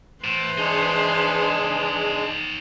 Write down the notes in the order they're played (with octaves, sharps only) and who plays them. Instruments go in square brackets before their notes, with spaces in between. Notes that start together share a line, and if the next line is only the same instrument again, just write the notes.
[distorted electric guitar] A2 [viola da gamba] E3 B4 C5
[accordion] G#3 D4 G#4 [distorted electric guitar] D#4 C#5